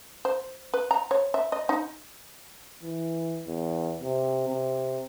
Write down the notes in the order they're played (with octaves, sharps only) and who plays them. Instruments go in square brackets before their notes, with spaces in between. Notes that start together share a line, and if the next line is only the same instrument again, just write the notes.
[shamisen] C5
B4
A#5
C#5
E5
D#5
D#4
[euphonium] E3
E2
C3
C3